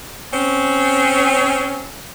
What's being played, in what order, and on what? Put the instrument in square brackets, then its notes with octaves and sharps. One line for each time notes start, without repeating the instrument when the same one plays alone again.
[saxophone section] C4 C#4